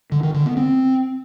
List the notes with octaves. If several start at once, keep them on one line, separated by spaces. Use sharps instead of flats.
D3
D#3
D3
B3
C4